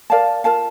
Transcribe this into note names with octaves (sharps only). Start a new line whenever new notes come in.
A#4 D5 F5 A5
F4 A#4 F5 A5